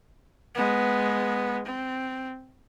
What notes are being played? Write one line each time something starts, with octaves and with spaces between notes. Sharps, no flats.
G#3 B3
C4